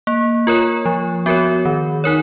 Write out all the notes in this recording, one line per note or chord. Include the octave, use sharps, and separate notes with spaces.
A#3
F4 A#4 C#5
F3
B3 F#4 A#4 C#5
D#3
D#4 A#4 C#5